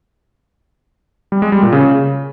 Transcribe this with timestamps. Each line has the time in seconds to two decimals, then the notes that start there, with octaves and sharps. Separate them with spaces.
1.32 G3
1.42 G#3
1.52 G3
1.62 A#2
1.72 C#3